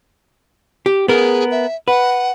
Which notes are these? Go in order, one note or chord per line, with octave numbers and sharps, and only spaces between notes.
G4
B3 G#4 A#4
E5
B4 F#5